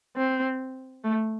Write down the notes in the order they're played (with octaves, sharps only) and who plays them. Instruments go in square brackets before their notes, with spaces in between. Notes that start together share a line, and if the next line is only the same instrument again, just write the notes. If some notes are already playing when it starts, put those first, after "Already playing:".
[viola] C4
A3